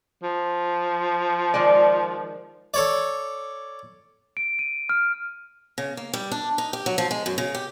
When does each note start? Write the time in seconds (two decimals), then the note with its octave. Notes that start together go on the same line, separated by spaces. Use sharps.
0.23 F3
1.54 D#3 G#3 D5
2.74 A4 C#5 D5
4.37 D7
4.59 D#7
4.89 F6
5.78 C#3
5.97 A#3
6.13 G3
6.32 D4
6.58 D#4
6.73 G4
6.86 F#3
6.98 F3
7.11 G#3
7.26 F#2
7.38 C#3
7.55 G4